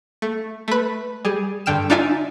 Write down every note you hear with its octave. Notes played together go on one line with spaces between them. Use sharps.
A3
A3 B4
G3 G#4
G2 D3 G5 F6 E7
D4 D#4 F4 D5 E5 G#5